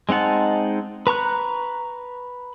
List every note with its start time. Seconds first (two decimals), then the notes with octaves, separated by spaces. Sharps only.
0.09 G#3 C4 D#4 F#5 A5
1.07 B4 A#5 C#6 F#6